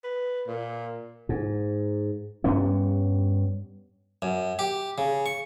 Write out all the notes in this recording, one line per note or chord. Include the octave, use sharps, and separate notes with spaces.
B4
A#2
G#2
G2 G3 B3 C#4
F#2
G4
C#3
C#6